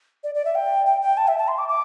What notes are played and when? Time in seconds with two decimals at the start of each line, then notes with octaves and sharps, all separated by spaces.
0.24 D5
0.35 D5
0.45 E5
0.55 G5
0.86 G5
1.02 G5
1.17 A5
1.28 E5
1.38 A5
1.48 C6
1.58 D6
1.69 D6